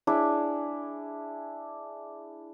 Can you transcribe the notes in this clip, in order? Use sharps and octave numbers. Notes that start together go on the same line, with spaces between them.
D4 E4 G#4